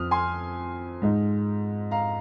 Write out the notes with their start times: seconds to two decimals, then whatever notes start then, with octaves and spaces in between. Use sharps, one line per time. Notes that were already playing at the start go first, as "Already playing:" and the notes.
Already playing: F2 F3 C4 D#6 F6
0.11 G#5 C6
1.02 G#2 G#3 D#4
1.91 F5 A#5